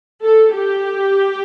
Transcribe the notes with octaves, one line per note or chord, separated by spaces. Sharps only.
A4
G4